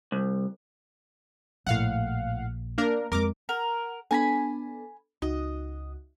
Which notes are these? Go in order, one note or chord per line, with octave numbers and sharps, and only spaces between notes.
C2
A#1 A2 F5 F#5
A#3 D4 A#4
F2 G#3 A#4 D6
A#4 F#5
B3 D4 A4 G#5 A#5 B5
C#2 D#4 F#4 D#5